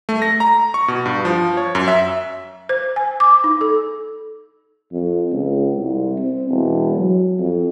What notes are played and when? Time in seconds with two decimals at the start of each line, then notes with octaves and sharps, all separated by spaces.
0.09 A3
0.22 A#6
0.40 A#5
0.74 C#6
0.88 B2
1.06 G2
1.25 F3
1.57 C#5
1.75 F#2
1.88 E5
2.69 C5
2.96 G#5
3.20 D6
3.44 D#4
3.61 A4
4.92 F2
5.32 C#2
5.77 C2
6.18 C4
6.50 E1
6.96 F#3
7.39 F2